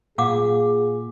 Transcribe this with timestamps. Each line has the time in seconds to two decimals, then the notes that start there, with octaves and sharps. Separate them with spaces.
0.18 A#2 G#4 F5 F#5 D6